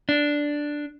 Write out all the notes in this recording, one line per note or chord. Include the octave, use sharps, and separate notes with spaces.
D4